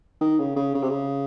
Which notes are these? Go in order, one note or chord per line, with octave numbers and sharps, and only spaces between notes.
D#3
C#3
C#3
C#3
C3
C#3